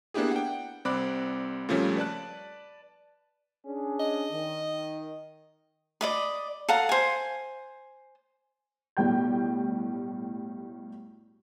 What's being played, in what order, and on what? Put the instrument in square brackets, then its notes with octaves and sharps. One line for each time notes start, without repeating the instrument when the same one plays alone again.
[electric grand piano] A#3 B3 D4 E4 G4 G#4
F#5 G5
C2 C4 D5 B5 D6 F#6
A#2 C#3 F3 G3 A3 C#4
B4 D5 A5 F#6
[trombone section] C#4 D4 G#4
[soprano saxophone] D#5
[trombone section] D#3
[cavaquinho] D5 D#5 B5
A4 F5 F#5 A#5
C5 G#5
[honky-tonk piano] B1 A2 G3 G5 G6